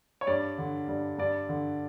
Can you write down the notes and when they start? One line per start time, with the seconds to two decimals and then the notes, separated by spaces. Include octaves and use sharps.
0.21 C#5
0.27 G2 D5
0.58 D3
0.89 G2
1.18 G2 D5
1.49 D3